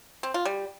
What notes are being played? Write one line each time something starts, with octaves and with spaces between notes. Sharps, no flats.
C4
F4
G3